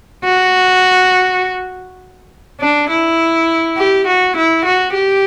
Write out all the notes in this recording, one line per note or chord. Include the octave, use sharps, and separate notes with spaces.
F#4
D4
E4
G4
F#4
E4
F#4
G4